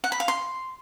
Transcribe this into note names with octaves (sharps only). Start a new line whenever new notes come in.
F#5
B5
F5
C6